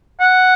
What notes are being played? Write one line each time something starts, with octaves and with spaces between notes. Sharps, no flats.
F#5